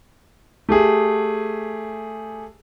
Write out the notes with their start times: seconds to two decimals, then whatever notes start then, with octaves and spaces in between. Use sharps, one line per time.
0.69 A3 G4 G#4